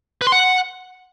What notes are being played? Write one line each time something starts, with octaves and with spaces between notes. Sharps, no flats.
B4
C6
F#5